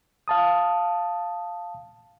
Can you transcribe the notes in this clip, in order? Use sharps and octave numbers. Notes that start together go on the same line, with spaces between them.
F5 A5 D#6